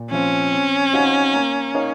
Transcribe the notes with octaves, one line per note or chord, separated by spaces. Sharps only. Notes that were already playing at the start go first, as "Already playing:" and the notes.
Already playing: A#2
F3 C4 C#4 F4 C5
C4
D#4 F#4 C5 F5
A#3
D#4 A#4 C#5 F5